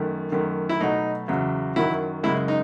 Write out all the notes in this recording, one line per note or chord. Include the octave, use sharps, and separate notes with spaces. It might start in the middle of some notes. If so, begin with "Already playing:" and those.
Already playing: F#2 D#3 A3
F#2 D#3 A3
E4
B2 F#3 A3 D#4
E2 C#3 F#3
F#2 D#3 F#3 E4
F#2 C#3 G#3 E4
D#4